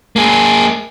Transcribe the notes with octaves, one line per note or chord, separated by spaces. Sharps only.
A#3 G#4